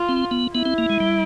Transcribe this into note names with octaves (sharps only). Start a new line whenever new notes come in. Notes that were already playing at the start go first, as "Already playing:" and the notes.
Already playing: F4
C4
B3
B3 E4
C4
A#3
G#3
G3